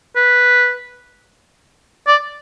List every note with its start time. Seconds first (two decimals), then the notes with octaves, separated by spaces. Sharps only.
0.16 B4
2.07 D5